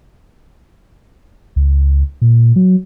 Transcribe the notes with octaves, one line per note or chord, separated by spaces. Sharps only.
C#2
A#2
F#3